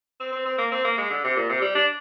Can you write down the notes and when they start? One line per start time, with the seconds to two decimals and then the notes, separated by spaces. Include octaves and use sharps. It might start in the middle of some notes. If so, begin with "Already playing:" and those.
0.20 C4
0.32 C4
0.46 C4
0.58 A#3
0.72 C4
0.85 A#3
0.98 G#3
1.10 D3
1.24 C3
1.36 A#2
1.49 C3
1.62 G3
1.75 D4